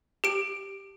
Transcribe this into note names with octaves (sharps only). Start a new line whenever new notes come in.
G4 D7